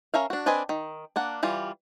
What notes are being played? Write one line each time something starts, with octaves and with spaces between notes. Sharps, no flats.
C#4 A#4 E5 F5
D4 F#4
C4 D4 B4 D#5 G#5
D#3
A#3 D4 F#5
E3 G3 F4